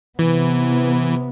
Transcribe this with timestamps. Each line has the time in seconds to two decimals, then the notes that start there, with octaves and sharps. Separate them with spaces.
0.19 C3 E3 B3